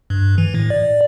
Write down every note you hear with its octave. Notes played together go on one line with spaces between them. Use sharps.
G2
E3
A2
D5